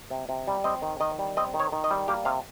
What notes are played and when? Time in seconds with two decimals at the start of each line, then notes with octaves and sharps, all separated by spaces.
0.10 C3
0.29 C3
0.47 G3
0.64 C4 D#5
0.82 D#3
1.00 D#3 D#5
1.19 G3
1.37 C4 D#5
1.54 D#3
1.60 C#5
1.72 D#3
1.84 D#5
1.91 G3
2.08 A#3 G4
2.25 C3 F5